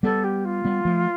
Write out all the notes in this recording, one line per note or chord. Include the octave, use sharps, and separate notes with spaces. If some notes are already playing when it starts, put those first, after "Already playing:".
G3 B3 A4
G4
F4
G3 B3
F3 A3